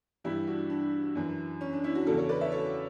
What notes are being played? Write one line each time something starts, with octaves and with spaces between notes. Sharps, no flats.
G2 E3 E4 G4
D4 F#4
D4
F#2 E3
C#4
D4
C#4 E4
D4 F#4
E2 C#3 E3 F#4 A4
A4 C#5
B4 D5
C#5 E5
A4 C#5